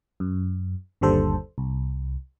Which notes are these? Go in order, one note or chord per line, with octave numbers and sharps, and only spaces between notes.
F#2
G1 D#2 D3 G3 A4 C5
C2